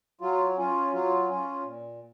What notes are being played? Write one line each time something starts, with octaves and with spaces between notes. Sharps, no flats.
F#3 F4
C#4 F4
F#3 F4
C#4 F4
A#2